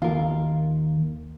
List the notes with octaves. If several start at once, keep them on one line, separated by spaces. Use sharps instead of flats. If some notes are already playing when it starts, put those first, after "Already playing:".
D#2 F4 A#4